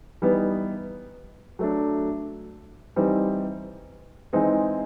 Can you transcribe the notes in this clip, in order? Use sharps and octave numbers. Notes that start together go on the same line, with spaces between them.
E3 G3 B3 D#4
F#3 A3 D4
E3 G3 C4 D#4
E3 G#3 C4 D#4